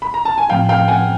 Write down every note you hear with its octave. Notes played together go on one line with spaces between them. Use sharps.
B5
A#5
A5
G#5
A2 F3 A3 C4 F5 G5
F5 G5
F#5 G#5